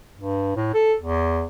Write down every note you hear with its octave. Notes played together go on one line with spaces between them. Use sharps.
G2
A2
A4
E2